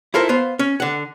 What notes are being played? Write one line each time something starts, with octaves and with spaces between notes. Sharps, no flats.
E4 F4 A4 A#4 C5
B3 C5 F5
C#4
D3 F#5